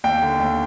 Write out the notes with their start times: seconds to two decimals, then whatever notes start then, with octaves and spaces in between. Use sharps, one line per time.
0.04 D#2 G5
0.22 D3
0.40 D#2